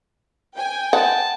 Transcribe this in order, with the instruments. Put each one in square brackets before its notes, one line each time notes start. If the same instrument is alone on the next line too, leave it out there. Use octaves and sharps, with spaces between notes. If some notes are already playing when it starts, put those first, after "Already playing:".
[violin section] G5 G#5
[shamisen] F#5 [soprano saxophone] A5